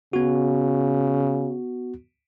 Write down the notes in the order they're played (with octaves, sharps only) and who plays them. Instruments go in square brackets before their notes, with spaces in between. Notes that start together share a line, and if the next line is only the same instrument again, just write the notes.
[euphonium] C#3 [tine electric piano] B3 F#4